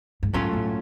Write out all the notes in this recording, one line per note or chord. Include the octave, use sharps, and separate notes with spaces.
G#2
A2 F#3 A3 C#4 F4 A4
A2